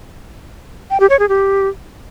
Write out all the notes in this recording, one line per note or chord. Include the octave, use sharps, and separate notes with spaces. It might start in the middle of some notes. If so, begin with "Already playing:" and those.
G5
G4
C#5
G#4
G4